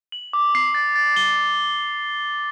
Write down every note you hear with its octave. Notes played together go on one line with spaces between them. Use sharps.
F#7
D6
C7
A6
A6
G7